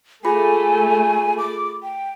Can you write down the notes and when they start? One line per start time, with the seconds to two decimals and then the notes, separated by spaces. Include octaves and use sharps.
0.25 A3 F4 G#4 G#5 B5
1.38 D6
1.83 G5